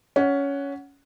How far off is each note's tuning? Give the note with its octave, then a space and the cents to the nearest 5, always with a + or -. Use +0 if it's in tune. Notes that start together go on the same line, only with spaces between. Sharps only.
C#4 +15 F#5 +0